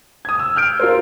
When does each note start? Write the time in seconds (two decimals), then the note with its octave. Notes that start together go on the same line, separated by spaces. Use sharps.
0.25 D#6 G#6
0.39 E6
0.56 F6 G6 D7
0.80 F4 A#4 C5